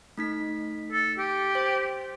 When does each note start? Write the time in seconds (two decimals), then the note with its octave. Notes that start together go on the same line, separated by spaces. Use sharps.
0.18 A3 D#4 B6
0.92 A4
1.18 G4
1.55 C5